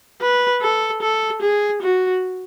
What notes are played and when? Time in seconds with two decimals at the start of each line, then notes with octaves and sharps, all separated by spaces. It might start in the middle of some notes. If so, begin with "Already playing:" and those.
0.22 B4
0.62 A4
1.02 A4
1.42 G#4
1.82 F#4